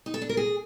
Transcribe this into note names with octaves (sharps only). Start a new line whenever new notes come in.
D#4
A4
D4
A#4
G#4